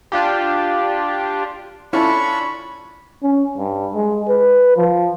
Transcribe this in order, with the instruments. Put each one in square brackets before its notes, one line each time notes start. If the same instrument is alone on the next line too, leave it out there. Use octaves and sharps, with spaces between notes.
[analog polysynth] D4 F4 G4
[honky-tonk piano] C#4 F4 A4 [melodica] D4 C#6 [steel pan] E4 [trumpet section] C#5 B5
[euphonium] C#4
G2
G#3
B4
F3